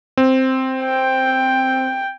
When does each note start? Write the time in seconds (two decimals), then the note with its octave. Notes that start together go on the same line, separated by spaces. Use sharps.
0.17 C4
0.85 G5